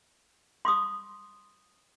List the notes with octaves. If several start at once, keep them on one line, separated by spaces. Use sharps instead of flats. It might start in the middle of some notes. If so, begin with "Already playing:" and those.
C6 D6 D#6